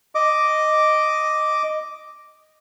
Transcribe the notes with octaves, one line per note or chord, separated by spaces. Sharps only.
D#5 D6